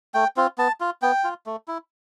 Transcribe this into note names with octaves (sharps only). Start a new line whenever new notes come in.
A3 G5
C4 F4
B3 A5
F4
B3 G5
F4
A3
E4